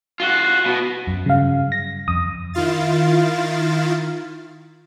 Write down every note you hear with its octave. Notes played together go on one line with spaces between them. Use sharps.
F4 F#4
B2
F#2
G2 C#3 F#3 F5
A#6
F2 D#6
D#3 E4 F4 F5 A6